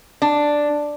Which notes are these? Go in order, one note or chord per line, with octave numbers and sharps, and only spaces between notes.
D4